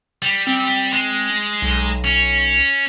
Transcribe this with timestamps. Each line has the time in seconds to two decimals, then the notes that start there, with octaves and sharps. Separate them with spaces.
0.22 G3
0.47 C4
0.93 G#3
1.62 B1
2.04 C#4